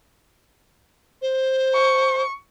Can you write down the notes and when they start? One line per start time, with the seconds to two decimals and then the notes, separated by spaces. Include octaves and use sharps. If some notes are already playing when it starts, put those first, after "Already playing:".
1.22 C5
1.74 C#6